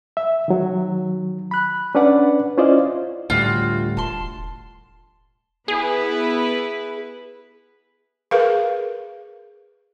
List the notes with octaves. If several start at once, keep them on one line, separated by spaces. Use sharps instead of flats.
E5
D#3 F#3
B5 F#6
C#4 D4 B4 D5 F#5
C#4 E4 F4 C5 D5 D#5
D2 A2 G3 F4 F#4
E1 A5 C6
B3 E4 G#4 B4
G#4 A#4 B4 F5